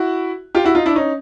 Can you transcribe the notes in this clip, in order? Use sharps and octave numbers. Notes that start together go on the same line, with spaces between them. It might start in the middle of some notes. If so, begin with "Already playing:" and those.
Already playing: E4 F#4
F4 G4
E4 F#4
D#4 F4
D4 E4
C#4 D#4